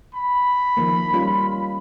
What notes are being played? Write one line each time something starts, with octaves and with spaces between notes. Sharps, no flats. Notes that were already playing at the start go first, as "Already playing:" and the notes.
B5
D#3 F3 A#3
G3 C#4 F4